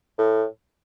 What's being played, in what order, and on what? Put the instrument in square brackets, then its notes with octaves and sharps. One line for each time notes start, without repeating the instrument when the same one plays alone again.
[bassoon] A2